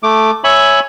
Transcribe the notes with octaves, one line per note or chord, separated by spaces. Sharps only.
A3 D6
C#5 E5 G#5 B5 C#6